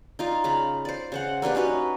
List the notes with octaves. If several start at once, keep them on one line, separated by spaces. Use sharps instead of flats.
D#4 F4 D5
C#3 A#5 B5
C5 D5
C#3 C5 F#5
A#3 D4 G4 B4
C#4 D#4 F#4 B4